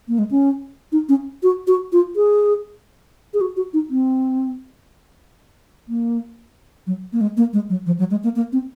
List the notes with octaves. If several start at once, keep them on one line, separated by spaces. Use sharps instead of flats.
A#3
G#3
C#4
D#4
C#4
F#4
F#4
F4
G#4
G#4
F#4
F#4
D#4
C4
A#3
F#3
A#3
G#3
A#3
G#3
F#3
F3
F#3
G#3
A#3
A#3
C4